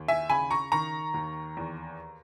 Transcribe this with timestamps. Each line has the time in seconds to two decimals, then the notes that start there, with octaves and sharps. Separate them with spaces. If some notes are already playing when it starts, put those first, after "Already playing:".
Already playing: D#2
0.08 E5 G#5
0.29 C#3 G#5 B5
0.51 A#5 C#6
0.72 D#3 A#5 C#6
1.14 D#2
1.57 E2